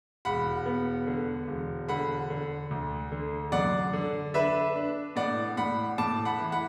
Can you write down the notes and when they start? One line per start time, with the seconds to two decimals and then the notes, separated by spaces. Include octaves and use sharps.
0.25 E1 F#5 B5
0.66 B3
1.07 D3
1.48 E1
1.89 D3 F#5 B5
2.30 D3
2.71 D2
3.12 D3
3.52 F#2 D5 F#5
3.93 D3
4.34 D4 B4 E5
4.76 D4
5.16 A2 D5 F#5
5.57 A2 F#5 B5
5.98 A2 A5 D6
6.25 F#5 B5
6.38 E3
6.52 F#5 B5